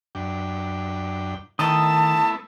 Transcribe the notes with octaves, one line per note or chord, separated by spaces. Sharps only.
F#2 D4 G5
D#3 A3 B3 E4 D#5 A5 D#6